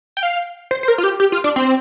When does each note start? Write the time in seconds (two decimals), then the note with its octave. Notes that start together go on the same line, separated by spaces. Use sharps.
0.17 G5
0.23 F5
0.71 C5
0.83 C5
0.88 A#4
0.98 F4
1.03 G4
1.20 G4
1.32 F4
1.44 D4
1.56 C4